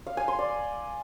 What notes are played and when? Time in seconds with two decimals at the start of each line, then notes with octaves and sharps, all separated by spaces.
0.07 F5
0.17 G#5
0.28 C6
0.39 D5